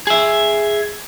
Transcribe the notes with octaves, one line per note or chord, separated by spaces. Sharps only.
G#4 E5